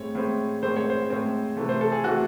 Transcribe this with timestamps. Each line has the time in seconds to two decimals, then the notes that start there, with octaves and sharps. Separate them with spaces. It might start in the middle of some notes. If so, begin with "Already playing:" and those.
Already playing: A2 G#3 C4 C#5
0.15 A2 G#3 C4
0.63 A2 G#3 C4 C5
0.76 C#5
0.90 C5
1.10 A2 G#3 C4
1.57 C3 E3 A3
1.69 C5
1.81 A4
1.92 G#4
2.03 C3 E3 A3 F#4